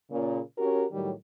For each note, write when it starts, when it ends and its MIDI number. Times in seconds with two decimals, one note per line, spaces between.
0.11 0.40 46
0.11 0.40 49
0.58 0.85 61
0.58 0.85 66
0.58 0.85 67
0.58 0.85 70
0.92 1.12 45
0.92 1.12 51
0.92 1.12 54
0.92 1.12 55